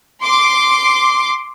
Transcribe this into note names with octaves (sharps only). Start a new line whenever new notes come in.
C6 D6